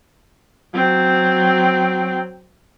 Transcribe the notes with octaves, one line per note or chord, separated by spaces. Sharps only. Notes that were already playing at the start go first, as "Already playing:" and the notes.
F#3 C4